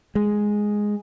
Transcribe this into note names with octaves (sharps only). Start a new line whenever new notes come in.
G#3